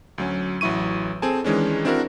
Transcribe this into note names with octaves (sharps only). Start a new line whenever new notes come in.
D2 F#3 C#4
A1 F#3 E4 C#6 D#7
C4 G#4 A4 G#5 A5
D#3 E3 G#3 C#4 D4
C4 D4 E4 F#4 A#4